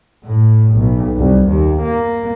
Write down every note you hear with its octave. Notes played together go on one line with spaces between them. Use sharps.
A2
B1
C2
D#2
A#3